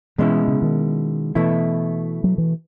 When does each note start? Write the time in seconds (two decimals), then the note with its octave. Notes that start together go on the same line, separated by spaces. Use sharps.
0.18 B2 E3 G#3 C#4 E4
0.48 C#3
0.62 D#3
1.35 B2 E3 A3 E4
2.24 F#3
2.38 E3